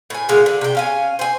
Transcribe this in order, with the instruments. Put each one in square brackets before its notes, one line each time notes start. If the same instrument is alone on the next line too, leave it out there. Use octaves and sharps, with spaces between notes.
[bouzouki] A2 G#5
A#2 D3 G#3 F5
D3
C3 G5
C#4 F5 G#5
C5 G#5